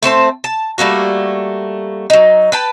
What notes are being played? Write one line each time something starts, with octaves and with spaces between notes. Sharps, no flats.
A3 C4 C5 A5
A5
G3 A3 A#3 F#4
F#3 D#4
B4 G5 A5